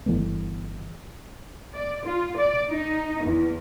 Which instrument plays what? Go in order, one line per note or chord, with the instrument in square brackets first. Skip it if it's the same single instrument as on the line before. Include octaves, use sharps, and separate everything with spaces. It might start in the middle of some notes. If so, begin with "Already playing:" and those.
[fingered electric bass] G1 E3 A3 B3
[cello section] D5
F4
D5
D#4
E2